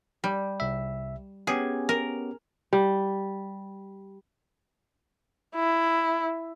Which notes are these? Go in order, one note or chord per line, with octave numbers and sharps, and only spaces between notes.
G3
C2 E5
B3 C#4 G4 G#4
A#4
G3
E4